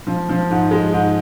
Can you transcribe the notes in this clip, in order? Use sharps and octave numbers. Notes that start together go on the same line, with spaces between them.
F3
F3
G#2
G#3
G#2